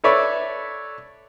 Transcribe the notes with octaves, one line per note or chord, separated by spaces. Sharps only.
A4 B4 C#5 D5 E5